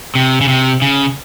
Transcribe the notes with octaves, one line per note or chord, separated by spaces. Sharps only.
C3
C#3
C3
C#3